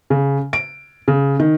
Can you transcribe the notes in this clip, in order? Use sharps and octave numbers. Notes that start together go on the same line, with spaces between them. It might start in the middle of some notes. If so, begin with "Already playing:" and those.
C#3
D7
C#3
D#3